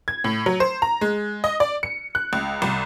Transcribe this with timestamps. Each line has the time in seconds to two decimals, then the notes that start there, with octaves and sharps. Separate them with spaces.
0.08 G#6
0.24 A2
0.46 F#3
0.60 C5
0.82 A#5
1.01 G#3
1.44 D#5
1.60 D5
1.83 C#7
2.15 F#6
2.33 C#2
2.62 C2